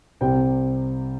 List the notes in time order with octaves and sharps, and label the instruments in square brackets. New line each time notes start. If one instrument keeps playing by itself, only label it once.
[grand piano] C2 C3 G3 C4 G5